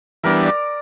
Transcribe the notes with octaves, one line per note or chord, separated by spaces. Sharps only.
E3 G3 B3 D4 A#4
D5